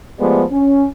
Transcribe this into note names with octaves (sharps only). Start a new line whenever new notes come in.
F3 G#3 A3 B3 G4 D5
C#4